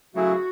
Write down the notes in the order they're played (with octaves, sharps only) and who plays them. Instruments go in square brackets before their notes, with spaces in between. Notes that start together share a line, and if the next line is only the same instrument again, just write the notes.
[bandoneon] C#3 F#3 A3 E4 G#4 [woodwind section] F#4